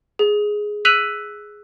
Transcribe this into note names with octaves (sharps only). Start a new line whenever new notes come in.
G#4
E6 F#6 B6 D#7 F7 F#7